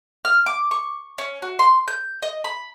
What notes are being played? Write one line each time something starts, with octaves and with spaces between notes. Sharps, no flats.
F6
D6
C#6
C#4
F#4
C6
G6
D#5
B5